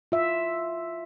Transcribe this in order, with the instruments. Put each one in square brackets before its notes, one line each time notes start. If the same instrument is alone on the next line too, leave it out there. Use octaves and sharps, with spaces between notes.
[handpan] F4 E5